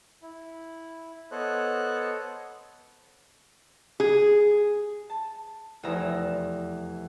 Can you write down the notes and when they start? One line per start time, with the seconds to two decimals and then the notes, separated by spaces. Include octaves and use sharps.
0.22 E4
1.31 B3 A4 C5 C#5 D#5 F#6
4.00 G#4
5.10 A5
5.83 F1 E2 E5 A#5 E7